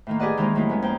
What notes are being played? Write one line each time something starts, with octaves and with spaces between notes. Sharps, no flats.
A2 D#3 A#3
G4 G#4 B4 D5 D#5 F#5
D#3 E3 G#3 A#3 C4 D#4
A2 F#3 G#3 A#3 D#4 E4
G#3 B3 C#4
F2 A#3 G5